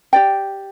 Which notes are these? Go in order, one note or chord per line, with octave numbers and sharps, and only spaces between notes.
G4 D5 G5